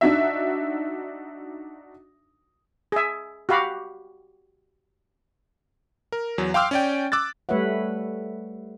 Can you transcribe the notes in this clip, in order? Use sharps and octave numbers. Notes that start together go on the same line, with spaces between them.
D4 D#4 F#4 E5
G#4 E5
F#4 G4 F5 B5
A#4
E2 F#3
F5 G5 C6 D6 E6 F6
C#4 D5 G5
D6 E6 F#6 A6
G3 A3 B4 C#5 E5 F#5